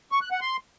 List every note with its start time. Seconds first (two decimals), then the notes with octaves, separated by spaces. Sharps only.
0.12 C#6
0.22 F#6
0.31 F#5
0.41 C6